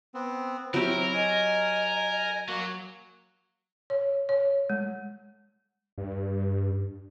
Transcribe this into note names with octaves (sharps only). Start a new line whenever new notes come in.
B3 C4
F#3 C4 E4 G4 A#4
D#5 G#5
F#3 A#3 F#4
C#5
C#5
G#3
G2